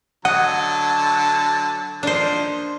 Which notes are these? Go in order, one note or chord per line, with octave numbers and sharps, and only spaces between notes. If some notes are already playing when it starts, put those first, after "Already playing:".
D3 F#3 D#5 F#5 A5
F3 A#3 D4 D#4 C5